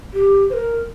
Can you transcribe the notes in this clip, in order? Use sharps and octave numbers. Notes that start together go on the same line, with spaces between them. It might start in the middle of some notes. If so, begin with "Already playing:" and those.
G4
C5
A#4